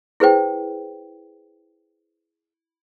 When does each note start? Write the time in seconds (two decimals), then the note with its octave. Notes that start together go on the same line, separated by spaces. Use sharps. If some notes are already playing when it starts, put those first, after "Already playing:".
0.20 E4 G#4 B4 C5 G5